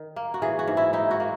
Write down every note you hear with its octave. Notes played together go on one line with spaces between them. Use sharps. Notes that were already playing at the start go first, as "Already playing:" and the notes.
Already playing: D#3
A#3
F#4
E3 G#4
F#4
G#2
E4
D#4 E4
F#4
A#3